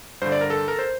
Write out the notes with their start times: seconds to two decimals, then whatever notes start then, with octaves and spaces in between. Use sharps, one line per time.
0.22 G2 D3 C5
0.32 D5
0.41 A#4
0.50 A4
0.68 A#4
0.79 C5